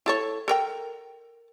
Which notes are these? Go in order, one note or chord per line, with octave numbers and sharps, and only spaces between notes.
E4 A4 C#5
A4 A#4 G5